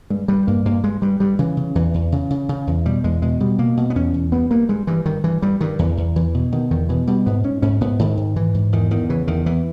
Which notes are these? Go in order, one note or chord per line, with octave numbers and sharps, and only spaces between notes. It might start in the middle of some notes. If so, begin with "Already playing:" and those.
G2 G#3
G2 G3
G2 A#3
G2 A#3
G2 G#3
G2 G3
G2 G3
C#3 E3
C#3
E2 E3
E2
C#3
C#3
C#3
E2
B2 G3
E2 G#3
B2 G#3
B2 G3
B2 A#3
B2
B3
E2 C#4
E2
G2 B3
G2 A#3
G2 G#3
G2 E3
G2 D#3
G2 E3
G2 G3
G2 D#3
E2 E3
E2
E2 E3
B2
B2 D#3
E2 D#3
B2 E3
B2 G3
G#2 B3
G#2 C#4
G#2 C#4
G#2 B3
G#2 D#3
G#2
G#2 E3
G#2
E2 D#3
E2 D#3
C#3 E3
E2 D#3
E2 E3